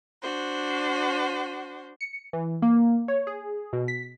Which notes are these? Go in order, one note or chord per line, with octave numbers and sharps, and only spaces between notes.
D4 F#4 C5
C#7
E3
A#3
C#5
G#4
B2
B6